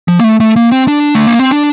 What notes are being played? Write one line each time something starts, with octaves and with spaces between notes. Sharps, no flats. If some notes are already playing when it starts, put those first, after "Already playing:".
F3
A#3
A3
A3
A#3
C4
D4
A3
A#3
C4
D4